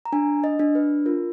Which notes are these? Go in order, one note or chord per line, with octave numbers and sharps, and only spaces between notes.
A#5
D4 G#5
D#5
D4
B4
F4 A#4